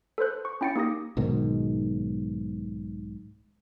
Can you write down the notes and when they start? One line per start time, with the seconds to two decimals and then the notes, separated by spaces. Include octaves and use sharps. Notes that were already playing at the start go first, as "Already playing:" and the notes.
0.18 A4 B4 C5 F#6
0.45 C#6
0.61 C#4 E4 G5 A6 C#7
0.76 A#3 D#4 G4 D#6 A#6
1.17 B1 G#2 B2 D#3